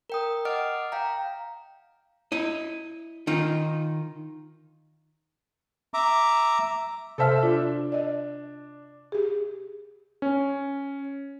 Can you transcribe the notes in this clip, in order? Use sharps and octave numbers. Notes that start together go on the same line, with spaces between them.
A#4 G5 D#6
D#5 F#5 D6 D#6 F6 D7
F5 G5 A#5
E4 D#5
D#3 D#4 F4
E5 A#5 D6
C3 A4 C5 E5 A5 F6
D4 F4
D5 D#5
G4 G#4
C#4